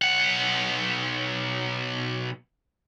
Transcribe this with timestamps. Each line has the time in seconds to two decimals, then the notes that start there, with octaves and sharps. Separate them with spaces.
0.02 B1 F#5